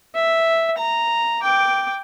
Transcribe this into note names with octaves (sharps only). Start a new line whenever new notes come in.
E5
A#5
G5 D6